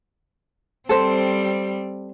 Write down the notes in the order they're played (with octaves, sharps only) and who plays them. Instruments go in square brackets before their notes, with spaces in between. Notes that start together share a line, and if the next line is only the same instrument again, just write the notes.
[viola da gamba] G3 C4 [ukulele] A4 C5